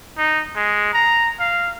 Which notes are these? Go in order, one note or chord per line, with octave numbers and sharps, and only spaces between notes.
D#4
G#3
A#5
F5